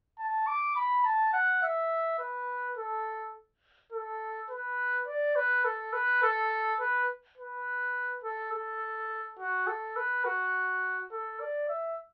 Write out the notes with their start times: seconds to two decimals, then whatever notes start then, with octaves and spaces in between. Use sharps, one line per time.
0.19 A5
0.47 D6
0.76 B5
1.05 A5
1.33 F#5
1.63 E5
2.19 B4
2.77 A4
3.93 A4
4.50 B4
5.08 D5
5.36 B4
5.65 A4
5.93 B4
6.23 A4
6.80 B4
7.38 B4
8.24 A4
8.53 A4
9.39 F#4
9.67 A4
9.96 B4
10.25 F#4
11.12 A4
11.40 D5
11.69 E5